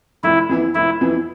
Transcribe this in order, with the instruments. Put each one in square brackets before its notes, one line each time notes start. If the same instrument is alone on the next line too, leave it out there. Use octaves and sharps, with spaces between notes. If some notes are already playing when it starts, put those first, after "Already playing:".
[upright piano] F1 [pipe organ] E4
[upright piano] F2 E3 B3 E4
[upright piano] F1 [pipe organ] E4
[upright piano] F2 E3 B3 E4